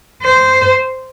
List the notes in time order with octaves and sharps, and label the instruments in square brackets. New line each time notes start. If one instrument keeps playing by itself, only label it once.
[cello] C5